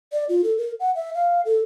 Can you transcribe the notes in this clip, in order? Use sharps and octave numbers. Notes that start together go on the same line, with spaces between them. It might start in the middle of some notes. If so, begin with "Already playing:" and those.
D5
F4
A4
A#4
F#5
E5
F5
A4